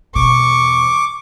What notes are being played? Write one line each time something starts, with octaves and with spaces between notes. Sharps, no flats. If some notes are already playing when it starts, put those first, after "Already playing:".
E2 B2 C#6 D6